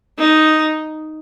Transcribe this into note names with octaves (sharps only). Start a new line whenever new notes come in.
D#4